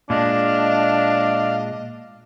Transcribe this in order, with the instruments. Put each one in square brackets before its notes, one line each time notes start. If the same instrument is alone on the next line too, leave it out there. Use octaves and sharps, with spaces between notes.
[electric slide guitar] A#2 G#3 [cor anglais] D4 [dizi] D#5 [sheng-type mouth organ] F5